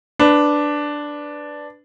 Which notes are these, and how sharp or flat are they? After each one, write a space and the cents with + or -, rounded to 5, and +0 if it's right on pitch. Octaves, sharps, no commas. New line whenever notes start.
D4 +0 B4 +10